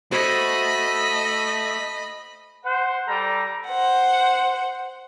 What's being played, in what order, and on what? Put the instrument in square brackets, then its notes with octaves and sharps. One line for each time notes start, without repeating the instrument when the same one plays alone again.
[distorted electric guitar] A3 [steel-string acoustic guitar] F#4 C5 [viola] D#5 [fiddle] B5
[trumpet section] C5 F#5
G3 A4 A#5
[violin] C5 F#5